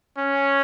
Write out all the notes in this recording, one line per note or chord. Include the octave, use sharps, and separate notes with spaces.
C#4